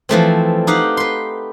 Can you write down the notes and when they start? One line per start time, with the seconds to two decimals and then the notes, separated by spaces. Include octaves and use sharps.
0.09 E3 F3 A3 C4
0.67 D#4 G4 F5 F#5
0.97 B4 C6